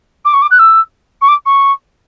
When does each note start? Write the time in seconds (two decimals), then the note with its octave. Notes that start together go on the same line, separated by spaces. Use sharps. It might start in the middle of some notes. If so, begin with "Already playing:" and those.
0.25 D6
0.33 C#6
0.42 D6
0.50 F#6
0.59 E6
1.21 C#6
1.28 D6
1.45 C#6